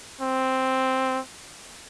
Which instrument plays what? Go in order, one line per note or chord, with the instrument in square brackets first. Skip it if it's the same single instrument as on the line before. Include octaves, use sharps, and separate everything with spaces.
[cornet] C4